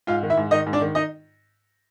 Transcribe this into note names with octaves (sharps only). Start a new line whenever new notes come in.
G#2 F4 F5
D#3
E4 E5
G#2
D#3 D#4 D#5
G#2
D4 D5
D#3
D#4 D#5